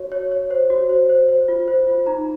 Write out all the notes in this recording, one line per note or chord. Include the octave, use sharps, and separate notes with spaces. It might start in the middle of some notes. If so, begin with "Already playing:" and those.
Already playing: F#4 C#5
C#5
C#5
C5
F#4
C5
C5
C5
F4
C5
F4
D#4 A#5